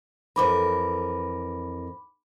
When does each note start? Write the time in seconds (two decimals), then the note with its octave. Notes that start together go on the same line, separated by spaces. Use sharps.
0.36 F2 E3 A#4 B5 D6